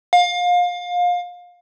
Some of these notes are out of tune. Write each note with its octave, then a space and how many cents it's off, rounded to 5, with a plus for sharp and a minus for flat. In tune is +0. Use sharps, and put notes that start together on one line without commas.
F5 +25